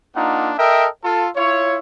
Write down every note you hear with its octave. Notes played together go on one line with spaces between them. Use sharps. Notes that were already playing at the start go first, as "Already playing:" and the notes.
A#3 D4 D#4 F4 F#5
A4 A#4 D#5 E5 G5
F4 A4
E4 F4 C#5